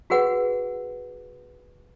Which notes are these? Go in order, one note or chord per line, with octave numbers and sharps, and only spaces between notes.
F#4 G#4 B4 F#5